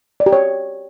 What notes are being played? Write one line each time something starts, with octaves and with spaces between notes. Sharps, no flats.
D5
G4
C#5